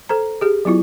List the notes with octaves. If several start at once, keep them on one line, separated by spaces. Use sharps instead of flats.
A4 C5 A#5
G4 G#4
F#3 B3 E4 F4